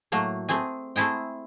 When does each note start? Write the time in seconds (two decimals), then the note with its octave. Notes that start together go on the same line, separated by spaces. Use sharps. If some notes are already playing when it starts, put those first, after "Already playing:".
0.12 A2 F#3 A3 A#3
0.49 A3 C4 G#4 G#5
0.96 A3 C4 E4 G#4 G5